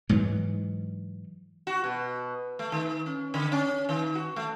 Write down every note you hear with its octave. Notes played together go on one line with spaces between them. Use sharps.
G#2 E3 F#3
F#4
B2
A3
D#3
C#4
D3
C#4
D#3
F#4
A3